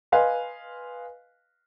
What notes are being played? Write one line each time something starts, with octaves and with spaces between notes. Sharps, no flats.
B4 D#5 F5 G#5 C6